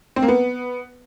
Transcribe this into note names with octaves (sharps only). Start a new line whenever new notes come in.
C4
A#3
B3